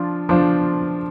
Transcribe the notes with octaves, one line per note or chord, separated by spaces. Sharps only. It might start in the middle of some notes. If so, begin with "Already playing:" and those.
Already playing: F3 D4 F4
F3 D4 F4 C5